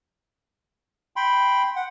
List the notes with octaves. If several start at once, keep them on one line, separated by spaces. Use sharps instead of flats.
G5 B5 C6
F#5